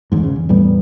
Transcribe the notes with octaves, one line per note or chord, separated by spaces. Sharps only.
G1 E2 G#2
C#3
E2
E2 A2 G3 B3